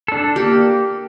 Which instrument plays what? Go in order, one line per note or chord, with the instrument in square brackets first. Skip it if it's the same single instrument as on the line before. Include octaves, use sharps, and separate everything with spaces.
[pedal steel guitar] D4 A4
[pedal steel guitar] A#3 [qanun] G4